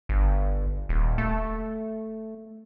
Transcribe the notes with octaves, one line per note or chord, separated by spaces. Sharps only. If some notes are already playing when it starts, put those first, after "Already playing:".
G1
D#1
A3